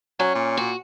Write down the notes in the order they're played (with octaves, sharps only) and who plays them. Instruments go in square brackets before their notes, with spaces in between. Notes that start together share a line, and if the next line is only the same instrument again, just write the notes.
[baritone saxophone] F#3 [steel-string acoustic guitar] C#4
[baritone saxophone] A#2
[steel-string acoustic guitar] F#4